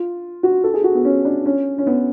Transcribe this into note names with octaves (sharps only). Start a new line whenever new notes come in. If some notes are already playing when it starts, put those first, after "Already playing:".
Already playing: F4
F#4
A4
G#4
F#4
B3
C#4
D4
C#4
C#4
B3